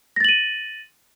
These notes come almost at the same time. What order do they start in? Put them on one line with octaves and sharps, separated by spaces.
A#6 A6 F#7 D#7